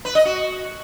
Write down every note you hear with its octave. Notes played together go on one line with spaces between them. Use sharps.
B4
D#5
F#4